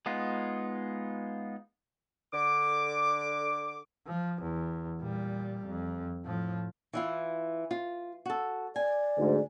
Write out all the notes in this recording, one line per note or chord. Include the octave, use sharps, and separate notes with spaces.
G#3 B3 D#4 F4
D3 D6
F3
E2
A#2 G3
F2
A2 F3
E3 E4 F4
F4
F#4 A4
D5 G#5
D2 G#2